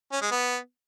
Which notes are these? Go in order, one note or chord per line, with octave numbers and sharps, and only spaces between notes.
C#4
G#3
B3